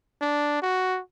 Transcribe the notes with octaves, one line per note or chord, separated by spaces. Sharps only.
D4
F#4